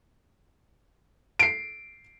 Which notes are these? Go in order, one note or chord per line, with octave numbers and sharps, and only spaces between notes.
C7 D7